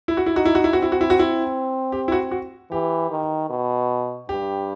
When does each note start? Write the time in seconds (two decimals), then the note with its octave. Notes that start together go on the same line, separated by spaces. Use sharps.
0.08 E4
0.17 F#4
0.26 E4
0.35 D#4 F#4
0.45 E4
0.55 F#4
0.64 E4
0.73 C4 F#4
0.82 E4
0.92 F#4
1.01 E4
1.10 F#4
1.19 E4
1.92 G4
2.08 E4
2.12 F#4
2.31 F#4
2.71 E3 G4
3.11 D#3
3.50 B2
4.29 G2 G4